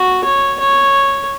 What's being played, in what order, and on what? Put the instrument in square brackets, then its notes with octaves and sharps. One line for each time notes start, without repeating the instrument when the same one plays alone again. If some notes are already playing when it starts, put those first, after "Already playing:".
Already playing: [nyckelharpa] F#4
C#5
C#5